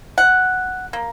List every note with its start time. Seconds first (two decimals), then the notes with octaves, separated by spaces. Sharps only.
0.18 F#5
0.93 A#3